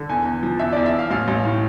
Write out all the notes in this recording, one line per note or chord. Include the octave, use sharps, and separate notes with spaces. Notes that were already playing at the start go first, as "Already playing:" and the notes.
Already playing: D3
E2 G#5
E2
F3
E2 E5
E2 D5
E5
E2 F5
A1 F5
A1
A2